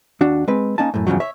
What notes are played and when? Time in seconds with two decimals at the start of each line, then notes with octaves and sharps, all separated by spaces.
0.21 D#2 D4 F#4
0.48 G#3 C4 B4
0.78 A#3 C#4 D#4 G#5 A5
0.94 F#2 A2
1.07 E2 G2 C#3 F3 F#3
1.20 C#5 E5